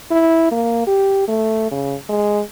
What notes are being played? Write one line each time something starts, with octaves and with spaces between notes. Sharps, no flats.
E4
A#3
G4
A3
C#3
G#3